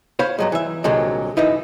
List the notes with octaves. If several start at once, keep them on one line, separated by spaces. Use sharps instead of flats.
C5 C#5 F5 B5
G2 F#3 G#3
E3 E5
C2 A#2 D3 F#3 G#3
F#2 E3 D#4 E4